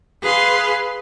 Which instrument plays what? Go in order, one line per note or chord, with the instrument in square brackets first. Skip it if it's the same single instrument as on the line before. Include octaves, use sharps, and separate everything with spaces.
[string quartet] G#4 B4 F5 C6